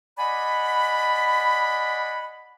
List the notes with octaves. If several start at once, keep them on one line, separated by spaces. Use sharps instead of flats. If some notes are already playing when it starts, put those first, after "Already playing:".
D5 D#5 F#5 G#5 B5